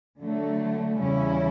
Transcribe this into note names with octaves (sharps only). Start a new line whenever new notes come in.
D3 F#3 A3
E2 C#3 G3 C#4 E4